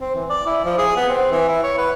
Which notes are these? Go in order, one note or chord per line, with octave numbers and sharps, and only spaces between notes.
C4
E3
D5
E4
F3
G#4
B3
C4
E3
E4
C#5
B4